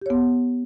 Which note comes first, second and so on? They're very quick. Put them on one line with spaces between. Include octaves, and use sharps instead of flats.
G4 C#5 B3